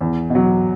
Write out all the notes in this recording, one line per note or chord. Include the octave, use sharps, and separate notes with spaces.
E2
B2 F#3